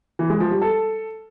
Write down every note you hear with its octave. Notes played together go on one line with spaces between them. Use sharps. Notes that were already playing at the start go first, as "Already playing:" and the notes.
E3
G#3
F3
G3
A4